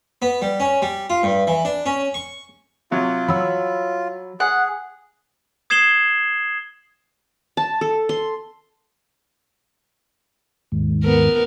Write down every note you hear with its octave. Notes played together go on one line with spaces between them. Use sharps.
B3
G3
C#4
G3
F4
G2
E3
D4
C#4
C#6
C3 F#3 F4
F#3 B5 E6
G#4 F#5
D#6 G#6 C7 E7 F#7 G7
A5
A4
C6
D#2 G#2
B3 A#4